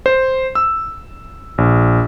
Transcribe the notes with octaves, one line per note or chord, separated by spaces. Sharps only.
C5
E6
A#1